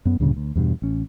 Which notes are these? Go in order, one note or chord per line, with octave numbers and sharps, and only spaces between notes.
F#2 B3
D2 G2 A#2 C#3
D2
E2 G2 B2
A1 C#4